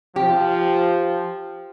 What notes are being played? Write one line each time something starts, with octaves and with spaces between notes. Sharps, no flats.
F3 G4